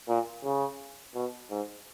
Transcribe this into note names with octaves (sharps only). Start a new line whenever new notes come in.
A#2
C#3
B2
G#2